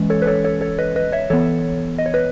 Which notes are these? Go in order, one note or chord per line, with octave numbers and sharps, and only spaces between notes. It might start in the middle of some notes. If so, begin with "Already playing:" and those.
Already playing: E3 G#3 C#4
A4 C#5
B4
A4 C#5
A4 C#5
A4 C#5
B4 D#5
B4 D#5
C#5 E5
E3 B3 A4 C#5
D#5
C#5
B4 D#5